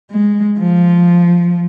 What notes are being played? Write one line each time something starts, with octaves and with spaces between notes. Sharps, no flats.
G#3
F3